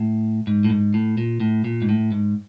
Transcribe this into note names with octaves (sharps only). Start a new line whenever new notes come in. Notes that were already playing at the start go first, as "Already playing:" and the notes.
Already playing: A2
G#2
A2
G#2
A2
A#2
A2
A#2
G#2
A2
G#2